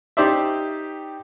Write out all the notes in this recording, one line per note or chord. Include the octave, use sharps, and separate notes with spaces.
D#4 G4 C5 D5 E5